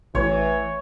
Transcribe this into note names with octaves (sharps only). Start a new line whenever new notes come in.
A1 E3 C#5